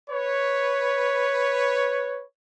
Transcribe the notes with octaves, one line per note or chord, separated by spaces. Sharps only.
B4 C#5